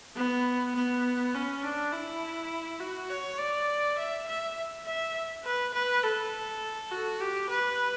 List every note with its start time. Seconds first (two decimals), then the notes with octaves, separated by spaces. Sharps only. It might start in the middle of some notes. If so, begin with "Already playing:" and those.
0.16 B3
0.76 B3
1.34 C#4
1.63 D4
1.92 E4
2.80 F#4
3.10 C#5
3.39 D5
3.98 E5
4.28 E5
4.86 E5
5.45 B4
5.74 B4
6.03 A4
6.92 F#4
7.21 G4
7.49 B4